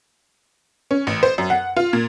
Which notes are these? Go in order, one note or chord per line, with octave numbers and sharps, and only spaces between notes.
C#4
A1
C5
F#2
F#5
F4
A#2